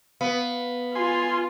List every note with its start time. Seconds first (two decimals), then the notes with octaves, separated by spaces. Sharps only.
0.21 B3 F5
0.95 F4 G#5 C6